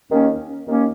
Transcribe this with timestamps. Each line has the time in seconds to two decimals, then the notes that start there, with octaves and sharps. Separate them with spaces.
0.09 D#2 D#3 A#3 C#4
0.66 D#2 D#3 A#3 C#4